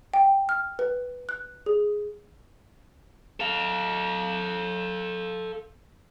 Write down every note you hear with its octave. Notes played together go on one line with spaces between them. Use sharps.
G5
F6
B4
F#6
G#4
A4 F5